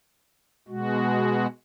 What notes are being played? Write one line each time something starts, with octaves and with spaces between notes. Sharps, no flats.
B2 G#3 F#4